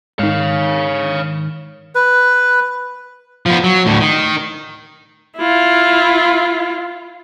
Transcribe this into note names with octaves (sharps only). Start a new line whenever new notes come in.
G#2 D#3 C#5 F5
B4
F3 B3
F#3
D2 A2
D#3
E4 F4